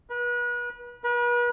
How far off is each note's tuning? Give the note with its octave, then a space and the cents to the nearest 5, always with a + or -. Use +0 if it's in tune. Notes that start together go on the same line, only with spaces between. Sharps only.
B4 -35
B4 -40